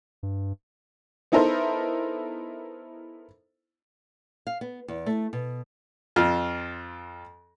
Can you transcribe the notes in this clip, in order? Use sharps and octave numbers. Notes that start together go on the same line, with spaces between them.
G2
B3 D#4 E4 A4 A#4 C5
F5
B3
E2
A3
B2
F2 F4 F6